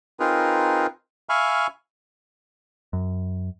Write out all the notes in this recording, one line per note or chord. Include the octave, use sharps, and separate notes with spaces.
C4 D#4 F4 G#4 A#4 B4
E5 F5 G#5 B5 C#6 F6
F#2